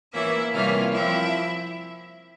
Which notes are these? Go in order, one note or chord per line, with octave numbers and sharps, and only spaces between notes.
E3 A#3 C#4 E4 E5
C3 E3 G3 A#3 C#4 F4 F5
F3 C4 E4 E5